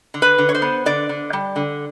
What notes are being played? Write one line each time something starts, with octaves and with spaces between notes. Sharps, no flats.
D3
B4
D3
C#5
C5
B3
D3 D5
D3
G3
D3